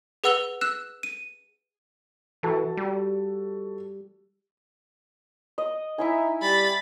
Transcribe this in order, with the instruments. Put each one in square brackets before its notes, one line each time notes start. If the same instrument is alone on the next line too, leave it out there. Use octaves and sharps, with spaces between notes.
[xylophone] G#4 B4 F#5 E6 F7 G7
E6 F#6 E7
D#7
[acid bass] E3 [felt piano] F#4 A4 A5
[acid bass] G3
[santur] D#5
[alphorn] D#4 [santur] E4 E5 G#5
[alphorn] G3 [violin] B5 A6